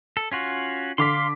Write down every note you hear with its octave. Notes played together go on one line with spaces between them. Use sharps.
A4
C#4 F4 F#4
D3 F5 C6 D6 B6